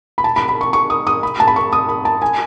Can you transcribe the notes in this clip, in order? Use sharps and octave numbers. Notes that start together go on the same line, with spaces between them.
B5
A5
B5
B5
C#6
C#6
D#6
D#6
B5
A5
B5
C#6
D#6
B5
A5
G#5